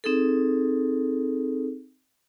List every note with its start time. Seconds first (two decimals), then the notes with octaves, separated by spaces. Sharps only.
0.04 C4 D#4 G#4 A4